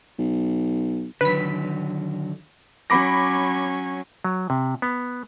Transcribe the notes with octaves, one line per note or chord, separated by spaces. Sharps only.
B1
D3 D#3 F#3 B4 B6
F#3 C#4 B5 D6 A#6
F#3
C3
B3